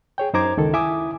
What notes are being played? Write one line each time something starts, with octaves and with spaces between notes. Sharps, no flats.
G#4 C#5 G5
F#2 D#4 C5 A#5 D6 G#6
C#2 D#3 A4
E4 E5 G#5 D6 D#6